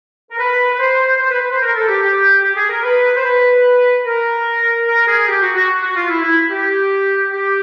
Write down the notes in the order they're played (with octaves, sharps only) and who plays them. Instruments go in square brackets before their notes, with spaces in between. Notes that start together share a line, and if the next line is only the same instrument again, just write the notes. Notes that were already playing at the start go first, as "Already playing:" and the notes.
[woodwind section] A#4
B4
B4
C5
C5
B4
B4
C5
A#4
A4
G4
G4
G4
G#4
A#4
B4
C5
B4
A#4
A#4
G#4
G4
F#4
F#4
F#4
F4
E4
E4
G4
G4